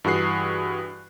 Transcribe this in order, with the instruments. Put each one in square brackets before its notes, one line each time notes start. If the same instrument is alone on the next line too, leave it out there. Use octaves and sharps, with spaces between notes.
[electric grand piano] G2 E3 F#4 G#4 F#6 C7